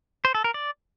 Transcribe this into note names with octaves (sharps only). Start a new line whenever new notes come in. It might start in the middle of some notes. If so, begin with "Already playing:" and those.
C5
A4
A#4
D5